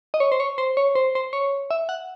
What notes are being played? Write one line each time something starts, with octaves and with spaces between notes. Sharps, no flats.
D#5
C#5
C5
C#5
C5
C#5
C5
C5
C#5
E5
F#5